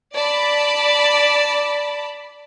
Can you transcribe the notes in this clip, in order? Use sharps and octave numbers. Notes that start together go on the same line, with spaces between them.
D5 A5 B5